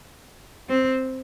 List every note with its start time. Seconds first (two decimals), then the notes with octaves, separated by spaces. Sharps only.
0.69 C4